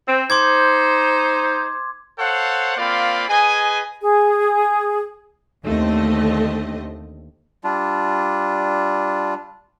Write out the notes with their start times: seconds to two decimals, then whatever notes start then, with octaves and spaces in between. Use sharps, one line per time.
0.07 C4
0.30 D#4 C5 C6 D6 G#6
2.19 A4 C5 C#5 F5 F#5
2.77 A#3 C4 F4 D5 F5 B5
3.29 G#4 B4 D#5 G#5
4.01 G#4
5.63 D#2 D3 A3 C4 D#5
7.64 G3 D4 F4